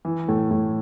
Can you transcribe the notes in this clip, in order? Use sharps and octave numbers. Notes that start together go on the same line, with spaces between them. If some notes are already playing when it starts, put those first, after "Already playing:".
E3
A2
A2